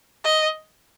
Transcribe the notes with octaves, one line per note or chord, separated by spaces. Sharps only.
D#5